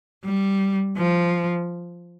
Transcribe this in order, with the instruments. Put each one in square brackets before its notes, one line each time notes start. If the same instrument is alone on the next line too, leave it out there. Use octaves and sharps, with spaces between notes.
[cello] G3
F3